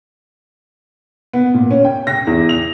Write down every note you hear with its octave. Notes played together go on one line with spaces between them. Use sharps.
B3
A#2
C#4
G5
A#6
E2
F7